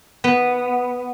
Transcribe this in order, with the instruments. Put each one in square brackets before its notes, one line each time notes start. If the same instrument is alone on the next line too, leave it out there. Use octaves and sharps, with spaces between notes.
[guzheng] B3